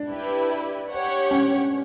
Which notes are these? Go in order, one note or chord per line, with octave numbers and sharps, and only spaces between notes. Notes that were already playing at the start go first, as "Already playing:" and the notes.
Already playing: D4
E4 G4 B4
G4 C#5 F#5
C#4